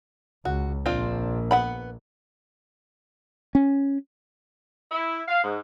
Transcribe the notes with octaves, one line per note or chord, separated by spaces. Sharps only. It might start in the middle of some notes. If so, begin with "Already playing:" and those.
C#2 F#4
A#1 C4 D4 F4
B3 F#5 B5
C#4
E4
F5
G#2